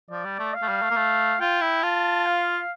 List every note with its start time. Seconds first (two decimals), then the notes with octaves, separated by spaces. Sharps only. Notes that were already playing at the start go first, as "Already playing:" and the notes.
0.10 F3 D5
0.25 G3
0.39 A3
0.54 F5
0.62 A3
0.68 G3
0.82 A3
0.91 A#3
0.96 A3
1.40 F4 G5
1.61 E4
1.83 F4 A5
2.26 F5